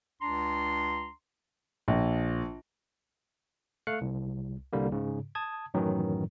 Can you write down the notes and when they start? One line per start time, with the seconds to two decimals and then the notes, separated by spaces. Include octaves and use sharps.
0.21 C#2 D4 A#5 C6
1.88 A#1
3.87 A3 F5 F#6 C#7
4.01 C2
4.73 C2 D3 G3 A#3
4.92 G#2 C#3
5.35 A5 D#6 G#6
5.74 F#2 A2 D#3 E3 F#3